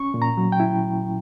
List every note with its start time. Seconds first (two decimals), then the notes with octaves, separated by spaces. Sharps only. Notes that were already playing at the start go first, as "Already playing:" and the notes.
Already playing: C#4 C#6
0.14 A#2
0.22 A#5
0.37 F#3
0.52 G5
0.60 E4